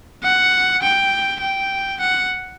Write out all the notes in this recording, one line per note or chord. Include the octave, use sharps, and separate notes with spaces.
F#5
G5
G5
F#5